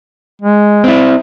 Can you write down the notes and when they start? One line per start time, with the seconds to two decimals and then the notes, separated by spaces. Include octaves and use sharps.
0.42 G#3
0.84 C4 E4